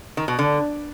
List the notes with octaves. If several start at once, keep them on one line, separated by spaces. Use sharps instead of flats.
D#3
B2
D3